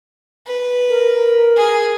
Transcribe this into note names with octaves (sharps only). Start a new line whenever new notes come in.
B4
A#4
G#4